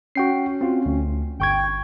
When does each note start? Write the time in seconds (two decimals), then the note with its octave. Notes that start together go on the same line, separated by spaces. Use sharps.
0.15 C#4 F#4 G5 C7
0.61 C4 F4 F#4
0.86 D2
1.40 G1 G5 C#6 G#6